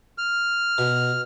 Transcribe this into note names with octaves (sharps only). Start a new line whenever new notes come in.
F6
B2